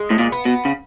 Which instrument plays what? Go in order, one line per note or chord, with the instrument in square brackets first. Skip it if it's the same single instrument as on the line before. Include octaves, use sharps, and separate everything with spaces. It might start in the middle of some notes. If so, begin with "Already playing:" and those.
Already playing: [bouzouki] G#3
[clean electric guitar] A2
A#2
[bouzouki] B3
[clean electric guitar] B2
C#3